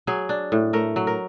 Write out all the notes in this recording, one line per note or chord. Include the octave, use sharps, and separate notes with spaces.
F#3 G#4
D4
A2
A3 A#4
F#3
A#4